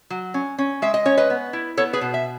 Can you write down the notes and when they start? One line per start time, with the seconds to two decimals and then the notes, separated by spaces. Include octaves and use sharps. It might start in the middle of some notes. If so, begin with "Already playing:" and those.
0.10 F#3
0.34 C#4
0.58 C#4
0.82 G#3 E5
0.94 D#5
1.05 C#4 C#5
1.17 B4 D#5
1.30 B3
1.53 E4
1.77 B3 A4 C#5
1.93 G#4 B4
2.01 B2
2.14 E5